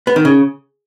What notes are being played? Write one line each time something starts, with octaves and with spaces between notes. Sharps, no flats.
B3
D#3
C#3